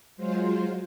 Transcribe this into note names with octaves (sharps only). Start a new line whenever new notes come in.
F#3 G#3 F4 C5